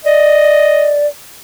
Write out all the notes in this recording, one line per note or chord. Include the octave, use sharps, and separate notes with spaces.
D5 D#5